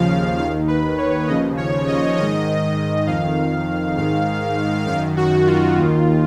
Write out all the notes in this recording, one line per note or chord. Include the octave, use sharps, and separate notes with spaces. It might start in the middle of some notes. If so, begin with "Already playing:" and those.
Already playing: D#2 C#3 F3 F5
D#2 D#3 F5
B4
C#5
D#2 C#3 F3 D#5
C#5
D#5
G#2 D#3 D#5
F2 D#3 F5
G#2 D#3 F5
F#2 D#3 F5
F#4
F4
D#2 D#3